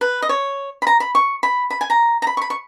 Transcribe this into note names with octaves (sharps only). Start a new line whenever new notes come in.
B4
D#5
C#5
B5
A#5
B5
C#6
B5
B5
G#5
A#5
A#5
B5
C#6
B5
C#6